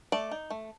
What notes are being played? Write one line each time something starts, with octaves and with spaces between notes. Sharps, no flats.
A3 D5
D#4
A3